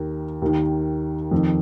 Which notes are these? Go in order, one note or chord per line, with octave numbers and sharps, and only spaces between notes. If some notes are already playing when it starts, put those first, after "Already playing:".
Already playing: D#2 D#3 A#4
D#2 D#3
F2 D#3